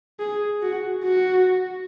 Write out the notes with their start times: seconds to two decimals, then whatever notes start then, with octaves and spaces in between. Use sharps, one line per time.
0.20 G#4
0.62 F#4
1.04 F#4